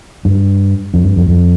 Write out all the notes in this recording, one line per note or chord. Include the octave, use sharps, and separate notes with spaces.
G2
F2
G2
F2
F2